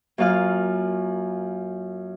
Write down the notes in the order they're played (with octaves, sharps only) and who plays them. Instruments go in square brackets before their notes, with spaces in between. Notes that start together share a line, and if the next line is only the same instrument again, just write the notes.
[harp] F#2 A#3 F4 F5 F6